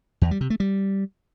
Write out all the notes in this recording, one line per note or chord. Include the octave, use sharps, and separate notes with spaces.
E2
G3
C3
A3
G3